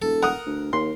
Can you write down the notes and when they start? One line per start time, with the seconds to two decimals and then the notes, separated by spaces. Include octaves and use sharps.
0.02 E1 A4
0.23 A#4 F#5 D#6
0.46 D2
0.73 D#2 C6